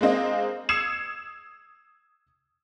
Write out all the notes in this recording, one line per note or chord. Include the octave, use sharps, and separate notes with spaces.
G#3 A#3 C4 D#5
D#6 E6 G#6 C7 C#7 E7